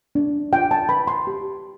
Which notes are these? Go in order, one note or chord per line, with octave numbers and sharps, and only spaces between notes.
D4
F4 G5
A5
B4 B5
C6
G4